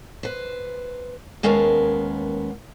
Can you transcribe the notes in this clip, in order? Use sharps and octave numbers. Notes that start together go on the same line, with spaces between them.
B4 C5
D#2 G#3 B3 C#4 A#4 A5